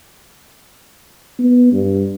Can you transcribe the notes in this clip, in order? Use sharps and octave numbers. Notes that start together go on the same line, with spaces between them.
B3
G2